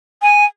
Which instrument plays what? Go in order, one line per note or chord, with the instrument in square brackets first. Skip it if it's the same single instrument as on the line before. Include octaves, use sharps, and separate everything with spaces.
[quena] G#5